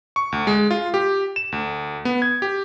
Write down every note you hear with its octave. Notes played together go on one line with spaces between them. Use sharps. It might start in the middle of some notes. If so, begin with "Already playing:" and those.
C#6
D2
G#3
F4
G4
E7
D2
B3
G#6
G4